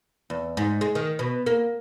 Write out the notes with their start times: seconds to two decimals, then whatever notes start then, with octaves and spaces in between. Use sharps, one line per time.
0.30 E2
0.57 G#2
0.81 G#3
0.95 D#3
1.19 B2
1.46 A#3